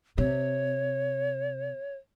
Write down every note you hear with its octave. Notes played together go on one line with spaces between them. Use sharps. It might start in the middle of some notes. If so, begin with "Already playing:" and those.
C3 C#5